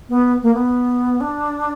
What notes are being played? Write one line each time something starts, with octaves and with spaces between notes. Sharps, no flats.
B3
A#3
B3
D4